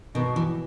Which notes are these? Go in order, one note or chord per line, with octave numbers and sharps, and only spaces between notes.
B2 D#3
E3